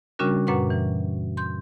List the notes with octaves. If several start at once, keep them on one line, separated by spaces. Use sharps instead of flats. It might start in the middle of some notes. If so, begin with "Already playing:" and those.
C#3 G3 C#4 D4 F#4 A#4
F#2 A#2 B4 F#5 C#6
E3
C6 G6